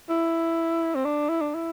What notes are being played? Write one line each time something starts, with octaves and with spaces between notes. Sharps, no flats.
E4
C4
D4
E4
D4
E4